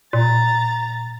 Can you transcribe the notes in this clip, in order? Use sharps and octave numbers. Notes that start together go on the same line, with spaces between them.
A#2 A#5 A6